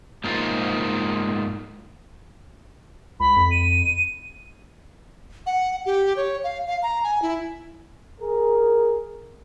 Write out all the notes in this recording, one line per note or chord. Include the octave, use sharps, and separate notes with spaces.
G#2 A#3 D#4 F4
C#2 B5
F2
D#7
F#5
G4
C#5
F5
F5
A#5
G#5
E4
G#4 A#4